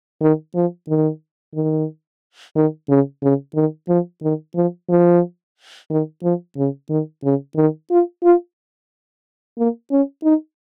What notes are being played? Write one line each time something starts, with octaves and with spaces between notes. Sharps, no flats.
D#3
F3
D#3
D#3
D#3
C#3
C#3
D#3
F3
D#3
F3
F3
D#3
F3
C#3
D#3
C#3
D#3
F4
F4
A#3
C#4
D#4